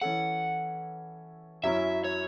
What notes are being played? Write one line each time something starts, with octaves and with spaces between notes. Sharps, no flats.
E3 C#4 A4 F#5
F#2 F#3 C#4 E4 E5
C#5